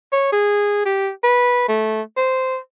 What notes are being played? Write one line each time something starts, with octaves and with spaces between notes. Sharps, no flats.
C#5
G#4
G4
B4
A3
C5